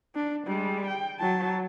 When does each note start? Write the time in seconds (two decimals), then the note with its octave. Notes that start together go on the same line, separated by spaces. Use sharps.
0.15 D4
0.47 G3 G#3
0.87 G5
1.19 F#3 A5